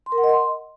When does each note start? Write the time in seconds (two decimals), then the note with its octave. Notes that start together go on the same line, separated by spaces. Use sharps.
0.06 C6
0.12 A#4
0.18 F#5
0.24 D#5
0.29 C6